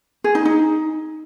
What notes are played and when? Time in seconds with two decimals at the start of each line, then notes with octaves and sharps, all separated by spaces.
0.24 G#4
0.35 D#4
0.45 D#4